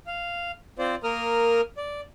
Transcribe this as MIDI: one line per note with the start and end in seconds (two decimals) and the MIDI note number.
0.07 0.51 77
0.79 0.95 60
0.79 0.95 65
0.79 0.95 72
0.79 0.95 74
1.04 1.61 58
1.04 1.61 70
1.04 1.61 87
1.04 1.61 89
1.77 2.01 74